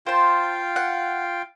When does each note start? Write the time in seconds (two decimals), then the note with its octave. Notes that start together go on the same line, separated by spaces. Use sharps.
0.06 F4 C5 F5 G5 A5
0.76 F#5